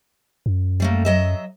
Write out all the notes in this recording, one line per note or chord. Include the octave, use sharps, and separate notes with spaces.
F#2
G3 A3 A#3
F#3 D#5 E5